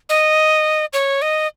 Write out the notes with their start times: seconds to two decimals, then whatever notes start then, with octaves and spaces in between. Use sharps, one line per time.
0.09 D#5
0.93 C#5
1.22 D#5